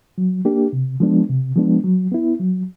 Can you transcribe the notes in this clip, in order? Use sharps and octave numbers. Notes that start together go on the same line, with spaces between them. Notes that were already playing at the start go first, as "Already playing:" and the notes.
F#3
A#3 D4 G4
C3
F3 G#3 B3 D4
C3
F3 G#3 B3 D4
F#3
B3 E4
F#3